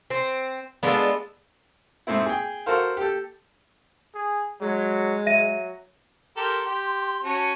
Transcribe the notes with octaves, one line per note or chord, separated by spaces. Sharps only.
C4
G#3 B3 D4 F4 A4
G#2 A3 C4 E4
G#4 G5
F#4 A4 A#4 C5 F5
G4 A4
G#4
F#3 G#3
F#3 E5 A#6 D#7
G4 A4 A#4 C6
G4
C#4 F#4 A5